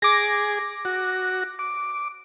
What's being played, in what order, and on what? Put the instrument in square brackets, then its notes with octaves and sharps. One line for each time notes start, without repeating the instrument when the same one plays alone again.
[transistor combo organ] G#4 [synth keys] D6 A#6
[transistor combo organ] F#4
D6